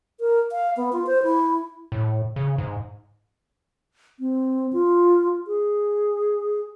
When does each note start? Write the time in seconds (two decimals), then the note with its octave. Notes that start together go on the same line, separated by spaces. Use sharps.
0.20 A#4
0.52 F5
0.77 B3
0.93 F4
1.07 C5
1.23 E4
1.92 A2
2.36 C#3
2.58 G#2
4.20 C4
4.73 F4
5.47 G#4